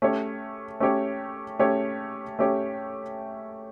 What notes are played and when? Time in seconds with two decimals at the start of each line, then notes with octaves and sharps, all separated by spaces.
0.02 A3 C#4 G4 C#5
0.80 A3 C#4 G4 C#5
1.59 A3 C#4 G4 C#5
2.39 A3 C#4 G4 C#5